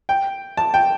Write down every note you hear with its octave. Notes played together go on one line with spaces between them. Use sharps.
G5
A5
G5